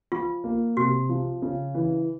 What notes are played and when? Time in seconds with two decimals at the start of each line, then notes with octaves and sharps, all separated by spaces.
0.12 F3 F4
0.44 A#3
0.77 C3 F#4
1.09 F3
1.42 C#3
1.75 E3